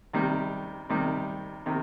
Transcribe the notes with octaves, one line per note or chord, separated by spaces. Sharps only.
C3 D#3 G3
C3 D#3 G3
C3 D#3